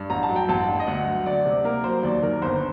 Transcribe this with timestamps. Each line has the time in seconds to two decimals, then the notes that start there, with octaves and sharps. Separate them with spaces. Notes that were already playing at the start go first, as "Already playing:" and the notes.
Already playing: G2
0.10 A1 A#5
0.23 A5
0.29 F#3
0.36 G5
0.49 A1 A5
0.68 G2
0.79 D#5
0.87 D2 F#5
1.06 F#3
1.26 D2 D5
1.45 C3
1.64 A#3 A#4
1.84 F#3 C5
2.03 D#2 D5
2.23 D#3 A#4
2.42 G1 C5